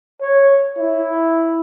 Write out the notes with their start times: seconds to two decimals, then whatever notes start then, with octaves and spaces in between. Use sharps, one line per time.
0.21 C#5
0.78 E4